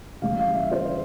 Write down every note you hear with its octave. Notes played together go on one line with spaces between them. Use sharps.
C#3 E3 G3 F5
F5
E5
C5